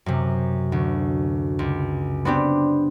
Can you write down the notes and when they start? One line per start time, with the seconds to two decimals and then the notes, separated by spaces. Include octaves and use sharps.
0.06 F#2 C3
0.72 D2
1.59 C#2
2.25 B3 C4 D4 G4